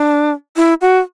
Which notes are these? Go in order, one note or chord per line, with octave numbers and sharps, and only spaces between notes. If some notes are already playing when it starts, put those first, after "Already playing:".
Already playing: D4
E4
F#4